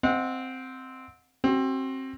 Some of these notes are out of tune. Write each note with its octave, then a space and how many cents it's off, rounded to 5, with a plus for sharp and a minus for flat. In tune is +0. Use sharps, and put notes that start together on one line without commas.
C4 -5 D#5 +25 F#5 -30
C4 +25 F#4 +35